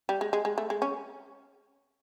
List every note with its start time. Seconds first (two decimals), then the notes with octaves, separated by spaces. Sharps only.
0.09 G3
0.21 G#3
0.33 G#3
0.45 G#3
0.58 A3
0.70 G#3
0.82 C#4